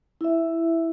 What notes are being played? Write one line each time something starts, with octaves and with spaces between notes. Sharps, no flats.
E4 E5